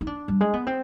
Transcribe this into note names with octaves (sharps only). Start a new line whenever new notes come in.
D#4
D4
G3
G#3
B3
C4